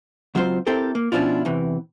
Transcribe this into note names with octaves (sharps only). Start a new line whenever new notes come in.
C#2 F#3 C4 F4 C5
C4 E4 G4 A4 A#4
A#3
B2 F3 C#4 D4 E4 F4
E2 C3 E3